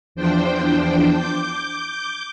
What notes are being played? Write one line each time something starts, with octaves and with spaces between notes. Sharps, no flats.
E2 F3 D4 C5 G5
D6 G6